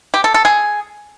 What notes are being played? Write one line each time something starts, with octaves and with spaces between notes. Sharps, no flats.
G4
A4
A4
G#4